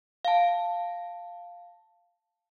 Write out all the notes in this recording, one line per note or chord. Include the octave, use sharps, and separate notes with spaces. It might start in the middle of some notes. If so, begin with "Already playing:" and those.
F5 A5